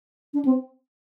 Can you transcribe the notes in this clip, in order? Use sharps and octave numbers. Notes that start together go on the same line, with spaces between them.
D4
C4